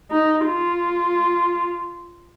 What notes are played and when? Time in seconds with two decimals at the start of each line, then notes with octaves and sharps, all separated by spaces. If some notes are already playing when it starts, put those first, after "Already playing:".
0.11 D#4
0.47 F4